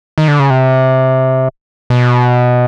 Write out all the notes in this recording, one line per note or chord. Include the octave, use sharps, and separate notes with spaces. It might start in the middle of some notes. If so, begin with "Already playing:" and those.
D#3
D3
C#3
C3
B2